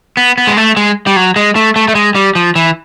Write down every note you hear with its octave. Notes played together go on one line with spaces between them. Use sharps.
B3
B3
G#3
A3
G#3
G3
F#3
G#3
A3
A3
A3
G#3
G3
F3
E3